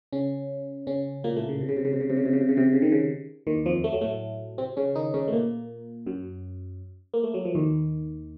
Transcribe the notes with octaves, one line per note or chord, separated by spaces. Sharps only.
C#3 C#4
C#3 C#4
A#2 A#3
A2 A3
C#3
C3
C#3
C3
C#3
C3
C#3
C3
C#3
C3
C#3
C3
C#3
C3
C#3
D#3
C#3
D#2 D#3
F2 F3
A3
F#3
A2 A3
C3 C4
C#3 C#4
D#3 D#4
C#3 C#4
A3
A#2 A#3
F#2 F#3
A#3
A3
F#3
F3
D#2 D#3